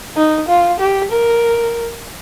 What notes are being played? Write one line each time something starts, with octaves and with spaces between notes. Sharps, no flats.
D#4
F4
G4
A#4